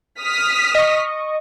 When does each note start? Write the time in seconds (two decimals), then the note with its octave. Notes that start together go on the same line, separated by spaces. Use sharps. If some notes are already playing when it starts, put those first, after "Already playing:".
0.20 D#6 F6 B6
0.75 D#5 C#6